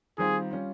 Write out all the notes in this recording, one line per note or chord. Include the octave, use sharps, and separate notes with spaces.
D#3 G3 C4 F4 G#4
G3 C#4 F4